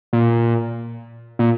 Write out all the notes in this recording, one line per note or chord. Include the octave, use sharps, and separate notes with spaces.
A#2
A#2